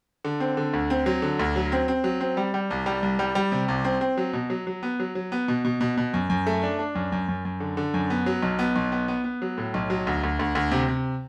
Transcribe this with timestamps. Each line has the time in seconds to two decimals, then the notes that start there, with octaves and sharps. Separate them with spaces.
0.25 D3
0.40 C4
0.57 D3
0.73 D2
0.90 C4
1.06 F#3
1.22 D3
1.39 D2
1.56 F#3
1.72 C4
1.88 C4
2.04 F#3
2.21 C4
2.37 G3
2.54 G3
2.70 C2
2.86 G3
3.02 C2
3.19 G3
3.35 G3
3.52 C3
3.68 C2
3.84 C4
4.01 C4
4.17 F#3
4.33 B2
4.50 F#3
4.67 F#3
4.83 B3
5.00 F#3
5.15 F#3
5.32 B3
5.48 B2
5.65 B2
5.81 B2
5.97 B2
6.14 F#2
6.30 F#2
6.47 A3
6.63 D4
6.79 D4
6.95 F#2
7.12 F#2
7.29 F#2
7.45 F#2
7.60 D3
7.77 D3
7.94 F#2
8.10 B3
8.26 F#3
8.42 B1
8.59 B3
8.76 B1
8.92 B3
9.08 B3
9.24 B3
9.42 F#3
9.58 A2
9.74 B1
9.90 F#3
10.07 D2
10.23 D2
10.39 D2
10.55 D2
10.71 C3
10.88 C3